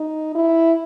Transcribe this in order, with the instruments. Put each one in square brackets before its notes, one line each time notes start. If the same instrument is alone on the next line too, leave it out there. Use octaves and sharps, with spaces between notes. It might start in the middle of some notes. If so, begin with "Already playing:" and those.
Already playing: [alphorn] D#4
E4